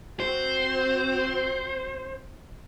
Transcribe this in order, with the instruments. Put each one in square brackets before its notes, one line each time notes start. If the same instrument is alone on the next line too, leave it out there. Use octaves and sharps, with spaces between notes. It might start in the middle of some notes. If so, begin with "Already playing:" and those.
[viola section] C4 F#4 [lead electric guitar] C5